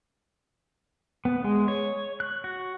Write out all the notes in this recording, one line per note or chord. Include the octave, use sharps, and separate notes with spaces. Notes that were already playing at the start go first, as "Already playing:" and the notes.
B3
G#3
C#5
F#6
F#4